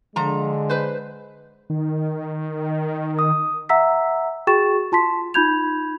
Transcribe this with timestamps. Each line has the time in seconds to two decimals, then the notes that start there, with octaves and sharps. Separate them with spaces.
0.16 D3 F3 G#3 A#5
0.69 B4 C5
1.70 D#3
3.19 D#6
3.69 E5 F#5 A#5 E6 B6
4.47 F#4 G#4 G5 C#6 A6 E7
4.92 F4 A5 C6 B6
5.34 D#4 F4 B5 G6 G#6 F7